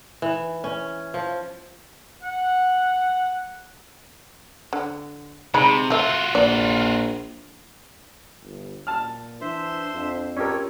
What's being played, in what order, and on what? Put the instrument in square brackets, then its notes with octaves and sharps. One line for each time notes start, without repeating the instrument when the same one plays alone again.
[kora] E3
C#4
F3
[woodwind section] F#5
[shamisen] D3
[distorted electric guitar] C3 [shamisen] G#3 D#4 B5
[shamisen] A3 E5 [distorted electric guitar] F4 F#4
[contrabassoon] A#1 [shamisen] D5
[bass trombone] G1
[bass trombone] A#2 [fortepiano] A5 F6
[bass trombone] E3 [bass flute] D4 [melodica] C5 E5 C6
[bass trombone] F2
[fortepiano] C#4 G4 A#4 [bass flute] F4 [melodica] A4 C#5